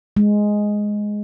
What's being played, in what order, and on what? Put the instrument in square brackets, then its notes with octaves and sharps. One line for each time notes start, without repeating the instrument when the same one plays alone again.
[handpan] G#3